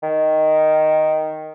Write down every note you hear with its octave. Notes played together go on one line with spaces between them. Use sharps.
D#3